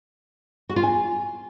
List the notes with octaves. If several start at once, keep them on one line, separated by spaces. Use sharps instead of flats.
F#4
F4
G#5